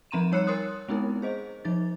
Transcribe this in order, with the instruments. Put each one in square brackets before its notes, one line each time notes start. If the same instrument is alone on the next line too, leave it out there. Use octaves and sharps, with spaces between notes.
[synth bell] F3 C4 A#5 C6 D#7 E7
G3 D#4 C#5 E6 F#6 C#7
A#4 C#5 C6 D#6 F#6
G#3 B3 C4 D#4 E4 A#4
G#4 C5 D#5
F3 D#4 A6